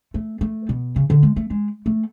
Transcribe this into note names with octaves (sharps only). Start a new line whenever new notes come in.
A3
A3
B2
C#3
D3
G#3
A3
G#3
A3